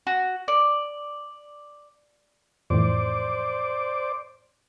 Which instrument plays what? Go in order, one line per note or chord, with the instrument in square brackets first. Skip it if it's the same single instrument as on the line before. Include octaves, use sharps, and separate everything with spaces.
[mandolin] F#4
D5
[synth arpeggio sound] F2 A2 E3 [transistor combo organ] C5 D5 D6